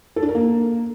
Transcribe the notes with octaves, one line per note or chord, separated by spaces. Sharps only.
A4
D4
A#4
A#3